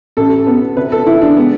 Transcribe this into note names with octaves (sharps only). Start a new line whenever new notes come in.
A1 A4
B3
C3 B4
A4
E3 E4
D4
G#3 B3